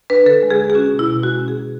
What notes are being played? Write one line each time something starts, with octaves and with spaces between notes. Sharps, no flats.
D4 B4
D3 A4
G#3
G#4
D2
G#4
C#4 F#4
B2
E4
B2
G#3 F#4
C#4
G#4
B2